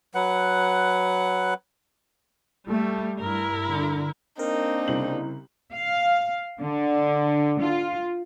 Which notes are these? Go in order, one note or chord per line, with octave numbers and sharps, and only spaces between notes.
F#3 B4 F#5
G3 A3
G2 E4 A#4
D3
A#3 C4 D4 D#4 A#4
C2 C#3 F#7
F5
D3
F4